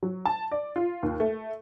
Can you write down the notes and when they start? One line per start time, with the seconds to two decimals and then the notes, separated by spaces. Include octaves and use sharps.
0.03 F#3
0.25 A5
0.52 D5
0.76 F4
1.03 D#2
1.20 A3